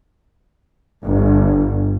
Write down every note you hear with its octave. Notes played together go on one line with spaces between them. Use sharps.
G1